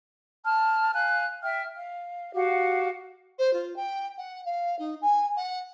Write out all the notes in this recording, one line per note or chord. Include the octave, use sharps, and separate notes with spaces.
A5 F6
F5 G#5 F#6
E5 G5 F6
F5
F#4 G4 F5 F#5
C5
F4
G5
F#5
F5
D#4
G#5
F#5